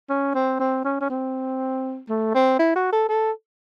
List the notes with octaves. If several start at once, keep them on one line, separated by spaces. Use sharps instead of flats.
C#4
C4
C4
C#4
C#4
C4
A3
C4
E4
F#4
A4
A4